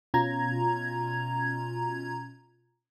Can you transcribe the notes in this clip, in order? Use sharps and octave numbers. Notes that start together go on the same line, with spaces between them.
B2 C#4 F4 A#5 G#6